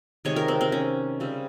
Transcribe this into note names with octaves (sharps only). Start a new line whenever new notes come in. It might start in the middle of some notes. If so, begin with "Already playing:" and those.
C3 D#3 G#3 C4 C#5
A#4
C4
C4
C#4
C#3 G3 C4